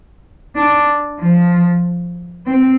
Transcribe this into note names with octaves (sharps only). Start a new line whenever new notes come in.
D4
F3
C4